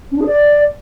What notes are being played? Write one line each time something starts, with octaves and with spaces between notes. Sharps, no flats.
C#4
D4
G#4
D5